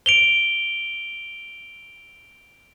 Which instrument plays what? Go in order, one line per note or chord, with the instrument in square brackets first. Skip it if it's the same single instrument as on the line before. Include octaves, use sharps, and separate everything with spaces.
[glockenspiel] D7 F7 G7